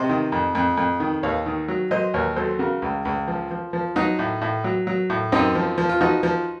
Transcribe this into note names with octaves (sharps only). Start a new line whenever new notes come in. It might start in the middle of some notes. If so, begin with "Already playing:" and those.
Already playing: C3 C5 D#5
D#3
F2
F2
F2
D#3
D#2 C#5 F5
D#3
F#3
F#3 C5 D#5
D#2 A#4 C#5
F#3 A4 C5
C#3 F#4 A#4
C#2
C#2
F3
F3
F3
F#3 D#4 F#4
A2
A2
F#3
F#3
A2
F#2 C4 D#4
F3
F3
F4
F3 D#4 F#4
F3